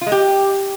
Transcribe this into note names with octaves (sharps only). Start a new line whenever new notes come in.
F4
G#3
G4